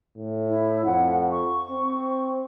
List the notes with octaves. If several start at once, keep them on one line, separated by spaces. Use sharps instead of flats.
A2
E4
F2 F#5
C#6
C4